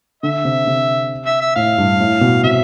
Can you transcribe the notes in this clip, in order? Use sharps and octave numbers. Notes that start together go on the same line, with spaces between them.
D3 E5
C3
C3
E5
E5
A2 F5
G2
A2
B2
C3 E5